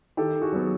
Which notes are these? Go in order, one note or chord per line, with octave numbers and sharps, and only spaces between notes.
D#3 G4 A4
F#4 G#4
F#3 B3